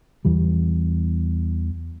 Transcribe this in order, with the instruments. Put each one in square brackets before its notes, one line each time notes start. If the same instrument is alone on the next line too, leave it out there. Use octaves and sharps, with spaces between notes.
[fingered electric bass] E2 E3 G3